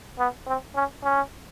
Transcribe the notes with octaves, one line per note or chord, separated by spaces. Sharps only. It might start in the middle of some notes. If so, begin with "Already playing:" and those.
B3
C4
C#4
C#4